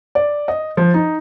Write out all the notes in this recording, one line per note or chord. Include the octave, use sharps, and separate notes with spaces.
D5
D#5
F3
D#4